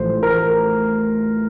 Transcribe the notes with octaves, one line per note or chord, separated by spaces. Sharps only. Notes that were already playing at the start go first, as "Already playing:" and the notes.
Already playing: A1 A2 F3 C5
A#4